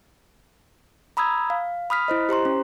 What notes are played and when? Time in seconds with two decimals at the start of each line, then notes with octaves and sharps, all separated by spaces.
1.17 A#5 B5 D#6 E6 G#6
1.50 F5
1.90 B5 D#6 F6 B6
2.08 E4 C5 D#5
2.29 G4 C5 A#5 C6
2.45 C#4